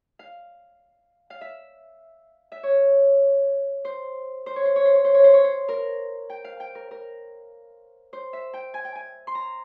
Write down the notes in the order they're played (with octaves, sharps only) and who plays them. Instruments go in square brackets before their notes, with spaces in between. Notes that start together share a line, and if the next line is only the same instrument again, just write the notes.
[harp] F5
F5
E5
E5
C#5
C5
C5
C#5
C5
C#5
C5
C#5
C5
C#5
C5
C#5
C5
A#4
G5
F5
G5
A#4
A#4
C5
E5
G5
G#5
G5
G#5
C6
A#5